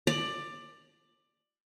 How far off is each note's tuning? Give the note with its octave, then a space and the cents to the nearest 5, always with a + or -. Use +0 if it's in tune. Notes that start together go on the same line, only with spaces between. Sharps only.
D5 +15